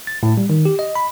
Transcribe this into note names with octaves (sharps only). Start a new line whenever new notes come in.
A6
A2
G3
D#3
G4
D#5
B5